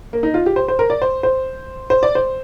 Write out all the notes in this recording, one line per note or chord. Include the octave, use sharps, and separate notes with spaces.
A#3
D#4
F4
G4
C5
C5
A#4
D5
C5
C5
C5
D5
C5